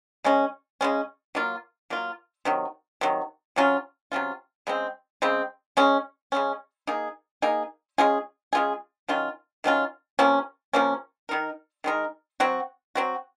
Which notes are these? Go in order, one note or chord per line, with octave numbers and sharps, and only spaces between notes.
C#3 G#3 C#4
C#3 G#3 C#4
F#3 A#3 F4
F#3 A#3 F4
C3 D#3 F#3
C3 D#3 F#3
C3 F#3 C#4 F4
C3 F#3 C#4 F4
C#3 G#3 C4
C#3 G#3 C4
C#3 G#3 C#4
C#3 G#3 C#4
A#3 D#4 G#4
A#3 D#4 G#4
G#3 C#4 F4 G#4
G#3 C#4 F4 G#4
D#3 F#3 C#4 F4
D#3 F#3 C#4 F4
C3 F3 A#3 C#4
C3 F3 A#3 C#4
D#3 G#3 D#4 A#4
D#3 G#3 D#4 A#4
F#3 C4 F#4
F#3 C4 F#4